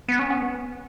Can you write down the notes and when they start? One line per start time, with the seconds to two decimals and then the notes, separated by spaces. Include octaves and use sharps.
0.08 B3
0.19 C#4
0.30 B3